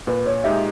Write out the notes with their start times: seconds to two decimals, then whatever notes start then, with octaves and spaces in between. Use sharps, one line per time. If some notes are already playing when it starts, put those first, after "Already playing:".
0.07 A#2 B4
0.26 C#5
0.44 G#3 D#4 G4 E5